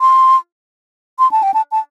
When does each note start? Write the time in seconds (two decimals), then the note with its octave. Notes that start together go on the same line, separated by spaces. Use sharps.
0.01 C6
1.19 C6
1.31 A5
1.43 G5
1.54 A5
1.71 A5